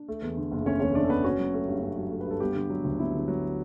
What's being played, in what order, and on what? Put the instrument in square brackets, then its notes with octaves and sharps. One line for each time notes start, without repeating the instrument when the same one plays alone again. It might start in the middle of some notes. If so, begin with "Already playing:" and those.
Already playing: [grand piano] D4
A3
E2
D3
F#1
A3 C#4 C#5
E2 C#4 C#5
D3 D4 D5
A4
F#1 B3 B4
C#4 F#4
F#3
A3
G2
C#4
F#3
A3
B4
G2 A4
G3 B3 G4
D3
F#3
D2
B3 E4
D3
F#3